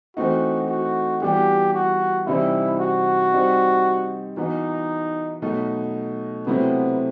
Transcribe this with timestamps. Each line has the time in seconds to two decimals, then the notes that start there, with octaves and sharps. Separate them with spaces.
0.17 E3 A3 C4 D#4 F#4
0.69 F#4
1.22 E3 G3 B3 F#4 G4
1.74 F#4
2.26 C3 E3 G3 C4 D#4 E4
2.80 F#4
3.32 G3 C4 D#4
4.37 E3 B3 D#4 F#4
5.42 B2 F#3 A3 D#4 F#4
6.47 C3 F#3 A3 B3 C4 E4